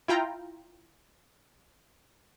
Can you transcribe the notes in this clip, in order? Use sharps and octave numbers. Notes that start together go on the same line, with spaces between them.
E4 F4 G5 A#5